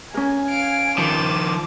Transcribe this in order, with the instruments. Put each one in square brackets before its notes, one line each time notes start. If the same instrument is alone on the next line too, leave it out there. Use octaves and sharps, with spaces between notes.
[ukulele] C#4 A#4 [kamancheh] G#5
[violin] F5 D7
[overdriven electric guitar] D#3 F3 [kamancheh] D6 [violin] E7